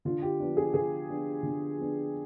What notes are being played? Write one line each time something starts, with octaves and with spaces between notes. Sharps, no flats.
D3 F4
G4
F3 B3 D4
G#4
D3 G#4
F3 B3 D4
D3
F3 B3 D4